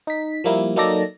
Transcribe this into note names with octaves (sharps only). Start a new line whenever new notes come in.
D#4 B6
F3 G3 A#3 E4
F#3 A#3 D#4 A4 D5 A#6